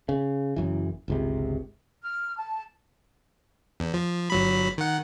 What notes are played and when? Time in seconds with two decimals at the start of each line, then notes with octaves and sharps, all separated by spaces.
0.09 C#3
0.56 F#1 F#2 E3
1.08 G1 C#2 C3
2.02 F6
2.36 A5
3.80 E2
3.94 F3
4.30 G1 F#3 B5
4.78 D#3 F#5